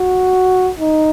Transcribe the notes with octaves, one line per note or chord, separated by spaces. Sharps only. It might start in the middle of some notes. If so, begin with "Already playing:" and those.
Already playing: F#4
D#4